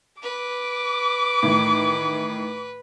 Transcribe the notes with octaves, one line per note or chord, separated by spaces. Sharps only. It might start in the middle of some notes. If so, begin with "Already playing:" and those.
B4 D6
A2 D#3 E3